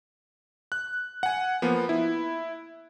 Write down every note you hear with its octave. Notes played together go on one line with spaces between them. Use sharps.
F#6
F#5 G#5
F3 A#3 B3
E4